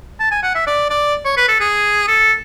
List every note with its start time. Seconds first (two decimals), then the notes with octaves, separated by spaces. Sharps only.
0.20 A5
0.31 G#5
0.43 F#5
0.55 E5
0.67 D5
0.90 D5
1.25 C#5
1.37 B4
1.48 A4
1.60 G#4
2.08 A4